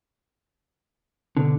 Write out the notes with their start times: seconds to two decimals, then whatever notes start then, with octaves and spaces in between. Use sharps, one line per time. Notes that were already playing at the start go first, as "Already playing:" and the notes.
1.37 B2 D3 B3